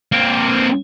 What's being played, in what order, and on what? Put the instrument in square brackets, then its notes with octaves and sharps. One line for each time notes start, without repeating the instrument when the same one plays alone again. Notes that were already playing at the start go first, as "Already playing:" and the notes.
[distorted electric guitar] A#3 C4